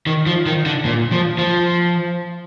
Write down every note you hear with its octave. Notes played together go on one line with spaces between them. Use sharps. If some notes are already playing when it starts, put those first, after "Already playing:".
D#3
F3
D#3
D3
A#2
F3
F3